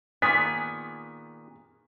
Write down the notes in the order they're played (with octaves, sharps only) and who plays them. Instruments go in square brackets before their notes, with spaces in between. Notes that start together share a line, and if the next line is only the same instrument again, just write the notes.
[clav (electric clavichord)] A#2 D#3 B3 [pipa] G#4 [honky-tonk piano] B6